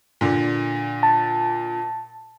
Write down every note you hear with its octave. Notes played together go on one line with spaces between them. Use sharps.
A#2 D3
A5